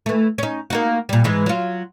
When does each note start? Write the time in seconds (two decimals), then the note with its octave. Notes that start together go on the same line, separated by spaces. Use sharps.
0.06 E3 A3
0.38 C#4 D#4
0.70 A#3 D#4 F#4
1.09 A#2 G3
1.24 G#2 E3 G#3
1.46 F#3 F4